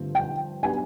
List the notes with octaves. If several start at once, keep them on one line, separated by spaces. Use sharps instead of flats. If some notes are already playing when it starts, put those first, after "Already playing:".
Already playing: G2 D3 F3 A3 C4
G5
F#3 B3 D4 G4 G#5